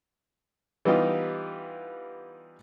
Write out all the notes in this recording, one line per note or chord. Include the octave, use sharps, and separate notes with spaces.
E3 G3 B3 D#4 F4 G4